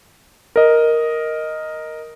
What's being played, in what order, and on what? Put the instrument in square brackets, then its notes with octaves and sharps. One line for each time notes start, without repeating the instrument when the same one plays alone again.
[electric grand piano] A#4 D#5